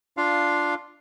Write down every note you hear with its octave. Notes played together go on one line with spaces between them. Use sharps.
D4 F4 F5